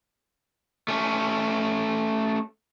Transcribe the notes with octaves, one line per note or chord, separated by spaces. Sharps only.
A3 C#4